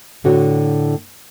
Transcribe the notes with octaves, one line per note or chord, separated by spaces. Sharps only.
A2 D3 F#4 C#5